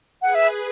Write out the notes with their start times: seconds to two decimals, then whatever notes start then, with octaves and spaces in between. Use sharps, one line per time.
0.22 G#4 B4 F#5
0.35 E5